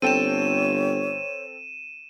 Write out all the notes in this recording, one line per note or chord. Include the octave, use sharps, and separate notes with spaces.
G1 C4 A4 C#5 G5 D#7 E7